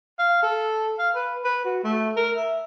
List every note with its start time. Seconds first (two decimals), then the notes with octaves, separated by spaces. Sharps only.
0.19 F5
0.43 A4
0.99 F5
1.15 B4
1.45 B4
1.65 F#4
1.84 A3
2.17 A#4
2.36 E5